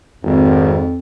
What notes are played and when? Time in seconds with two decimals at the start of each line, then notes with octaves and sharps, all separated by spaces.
0.23 G#1 F2